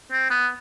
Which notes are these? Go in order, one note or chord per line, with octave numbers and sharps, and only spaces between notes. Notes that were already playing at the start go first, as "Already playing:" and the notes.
C4
B3